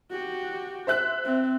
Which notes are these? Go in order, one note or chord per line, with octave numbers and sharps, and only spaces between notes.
F#4 G4
C5 E5 F#6
C4